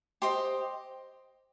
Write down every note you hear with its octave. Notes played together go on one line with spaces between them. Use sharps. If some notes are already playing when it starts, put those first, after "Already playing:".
G4 C5 D#5 C6